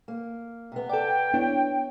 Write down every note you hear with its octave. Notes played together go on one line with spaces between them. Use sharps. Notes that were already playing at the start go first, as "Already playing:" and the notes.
A#3
C3 B3
A4 D5 G5
B3 D4 E4 C#5